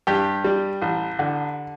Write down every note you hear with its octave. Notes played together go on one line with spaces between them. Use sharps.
G2 G4
G3
A1
D3